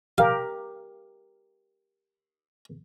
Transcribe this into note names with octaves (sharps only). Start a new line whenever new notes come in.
G4 A#4 F5